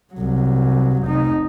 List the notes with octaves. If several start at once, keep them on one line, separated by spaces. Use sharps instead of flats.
C2 F#3
F1 D#4